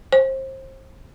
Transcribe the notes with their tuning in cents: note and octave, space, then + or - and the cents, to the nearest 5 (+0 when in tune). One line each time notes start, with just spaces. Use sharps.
C5 +30